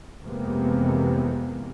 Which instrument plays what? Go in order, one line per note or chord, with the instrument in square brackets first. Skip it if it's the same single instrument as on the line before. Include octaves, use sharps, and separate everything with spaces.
[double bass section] F2 C3 E3 G#3 A#3 B3